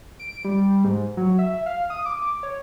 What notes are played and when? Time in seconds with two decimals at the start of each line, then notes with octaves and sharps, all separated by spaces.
0.19 D7
0.45 G3
0.84 G#2
1.17 F#3
1.39 E5
1.66 F5
1.90 D#6
2.06 D6
2.43 C#5